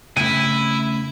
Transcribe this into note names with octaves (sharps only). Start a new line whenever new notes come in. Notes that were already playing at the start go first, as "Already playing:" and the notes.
C#3 A3 C4 E4 D#7